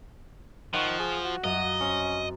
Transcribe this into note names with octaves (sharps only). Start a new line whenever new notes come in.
D#3 F3 F#5 C#6 D#7
G#4
F#4
F#2 D#5 F5
C4 C#4